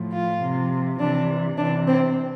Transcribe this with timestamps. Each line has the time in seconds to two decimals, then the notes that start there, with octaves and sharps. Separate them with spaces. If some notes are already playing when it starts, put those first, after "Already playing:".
Already playing: A2 F3
0.12 F4
0.41 C3 F3
1.00 C3 E3 D4
1.57 C3 E3 D4
1.87 C4